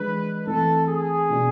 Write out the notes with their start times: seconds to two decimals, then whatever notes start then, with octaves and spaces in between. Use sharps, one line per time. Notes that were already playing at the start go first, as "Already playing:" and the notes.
Already playing: E3 G#3 D4 B4
0.47 E3 A3 C4 A4
0.88 G#4
1.29 B2 B3 D4